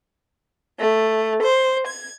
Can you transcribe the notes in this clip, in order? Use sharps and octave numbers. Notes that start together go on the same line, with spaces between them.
A3
C5
G#6